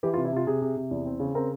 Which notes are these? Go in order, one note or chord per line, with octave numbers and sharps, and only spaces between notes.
E3 G4
F4
C3
E4
C3 F4
C3 G#4
C3
C3
E2
C4
C#3
C4 A#4